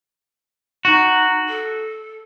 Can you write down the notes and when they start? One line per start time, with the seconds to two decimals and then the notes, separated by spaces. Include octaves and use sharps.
0.85 D#4 F#4
1.48 A4